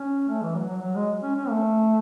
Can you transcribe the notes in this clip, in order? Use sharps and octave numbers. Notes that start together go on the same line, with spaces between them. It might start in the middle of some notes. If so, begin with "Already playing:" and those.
Already playing: C#4
A3
E3
F#3
F#3
F#3
G#3
C#4
C#4
A3